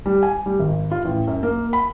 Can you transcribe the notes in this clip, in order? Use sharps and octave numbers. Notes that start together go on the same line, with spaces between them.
G3
G#5
G3
G#1
F4
A1
F#2
A#3
B5